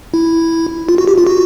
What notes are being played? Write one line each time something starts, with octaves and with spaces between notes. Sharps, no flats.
E4
F4
F#4
G4
F4
F#4